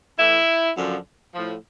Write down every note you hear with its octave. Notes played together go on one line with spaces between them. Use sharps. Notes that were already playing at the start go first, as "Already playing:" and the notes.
A2 E3 E4
F#2 D3 F3
A2 F3